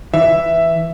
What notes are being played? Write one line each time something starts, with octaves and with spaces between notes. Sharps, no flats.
E3 E5